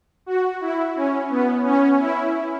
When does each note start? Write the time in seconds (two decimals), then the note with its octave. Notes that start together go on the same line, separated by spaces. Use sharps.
0.26 F#4
0.61 E4
0.96 C#4
1.30 B3
1.64 C#4
1.99 E4